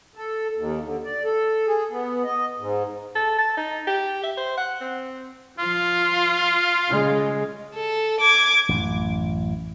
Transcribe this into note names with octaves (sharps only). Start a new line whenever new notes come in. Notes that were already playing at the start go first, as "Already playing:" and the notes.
A4
D#2
D3
D5
A4
G#4
B3
D#5
G#2
A4
A5
D#4
G4
E5
C5
F#5
C4
F3 F4
C#3 G#3
A4
D6 G#6
A1 F#2